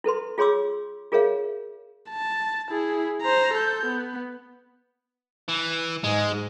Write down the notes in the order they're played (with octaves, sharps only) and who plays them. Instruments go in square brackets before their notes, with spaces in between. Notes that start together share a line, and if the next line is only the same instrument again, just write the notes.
[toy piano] E4 A4 B4 C6
F4 G#4 C#5 C6 D6 E6
F4 G#4 A#4 C#5 E5 F5
[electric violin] A5
E4 G#4
C5 A#5
A4 G6
B3
[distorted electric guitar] E3
[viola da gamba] G#2 [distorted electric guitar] G#3